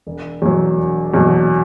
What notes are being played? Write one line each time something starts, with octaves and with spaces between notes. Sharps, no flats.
E1
E2 B2 F#3
E1
E2 B2 F#3